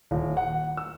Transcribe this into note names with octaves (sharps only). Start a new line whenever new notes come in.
D#1
F#5
E6